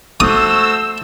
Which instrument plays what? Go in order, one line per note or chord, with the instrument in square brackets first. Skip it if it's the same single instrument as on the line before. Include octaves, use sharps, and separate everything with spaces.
[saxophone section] A3 F#4 C5 [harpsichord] D#6 [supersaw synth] E6